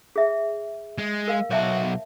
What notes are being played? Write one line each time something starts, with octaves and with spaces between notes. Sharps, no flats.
G#4 E5
G#3
A#4 F5
B1 F#4 C#5 E5 A5